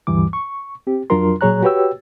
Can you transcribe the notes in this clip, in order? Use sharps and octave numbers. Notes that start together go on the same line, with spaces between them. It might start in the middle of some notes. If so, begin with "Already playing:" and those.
D2 G2 E3 G3 D6
C#6
C4 G4
F2 F#3 D4 F4 A#4 C6
A#2 F#3 G#4 C#5 A#5 F#6
F#4 G4 B4 C#5 G5 E6